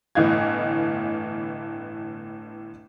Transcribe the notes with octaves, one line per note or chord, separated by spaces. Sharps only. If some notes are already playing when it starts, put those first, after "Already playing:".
G1 A2 E3 D#5 F5 G#6